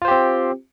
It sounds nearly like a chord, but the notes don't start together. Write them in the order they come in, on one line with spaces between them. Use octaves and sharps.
F4 C5 G4 C4